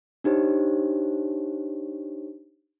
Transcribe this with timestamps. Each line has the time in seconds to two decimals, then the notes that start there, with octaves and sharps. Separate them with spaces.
0.24 D4 D#4 G4 C5 C#5